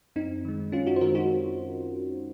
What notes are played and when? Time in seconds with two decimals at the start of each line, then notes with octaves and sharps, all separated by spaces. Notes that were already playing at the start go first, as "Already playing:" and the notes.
0.16 F#2 C4 D#4
0.45 D#3 G#3
0.72 F#2 C#4 F4
0.87 D#4 F#4
0.96 C5
1.01 D#3 G#3 F#4 A#4
1.15 D#4 F#4